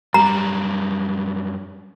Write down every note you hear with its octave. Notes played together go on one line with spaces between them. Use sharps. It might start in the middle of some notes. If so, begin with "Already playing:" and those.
F#2 G3 A#5